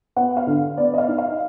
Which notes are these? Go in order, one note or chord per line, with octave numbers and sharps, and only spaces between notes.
B3 F#5
F5
D3
B3 D5
D#5
F5
D#4
F5